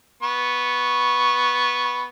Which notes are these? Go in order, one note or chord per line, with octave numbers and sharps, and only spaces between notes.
B3 C#6